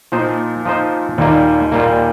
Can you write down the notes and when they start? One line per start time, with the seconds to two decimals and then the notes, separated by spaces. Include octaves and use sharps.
0.12 A#2 F3 D#4 C5
0.65 F3 D#4 C5
1.18 D#2 A#2 D#3 G3 A#3
1.72 A#2 G3 A#3